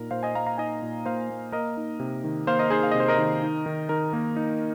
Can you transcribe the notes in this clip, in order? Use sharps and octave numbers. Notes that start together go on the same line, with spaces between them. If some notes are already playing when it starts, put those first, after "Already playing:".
Already playing: A#2 D#4 A#4
A#2 C5 F5
D#5 G#5
A#3 F5 A#5
F5 A#5
D#4 D#5 G#5
A#2
A#2 C5 F5
A#3
A#3 A#4 D#5
D#4
C3
D#3
A#3 C5 F5
A#4 D#5
D#4 G#4 C5
F5
C3 D#5
C5
A#4 D#5
D#3
D#4
D#3
D#3 A#4
A#3
D#4